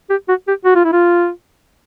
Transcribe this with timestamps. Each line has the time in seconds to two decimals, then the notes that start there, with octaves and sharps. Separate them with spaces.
0.10 G4
0.29 F#4
0.48 G4
0.65 F#4
0.76 F4
0.85 E4
0.93 F4